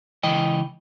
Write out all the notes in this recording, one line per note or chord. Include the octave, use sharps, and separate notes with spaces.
C#2 E3 D#5 G5